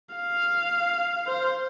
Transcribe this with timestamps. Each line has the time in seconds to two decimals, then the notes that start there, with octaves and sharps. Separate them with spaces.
0.15 F5
1.27 C5